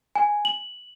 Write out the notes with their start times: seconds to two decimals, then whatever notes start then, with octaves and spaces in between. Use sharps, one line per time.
0.15 G#5
0.45 F#7